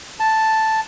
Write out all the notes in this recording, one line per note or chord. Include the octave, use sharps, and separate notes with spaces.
A5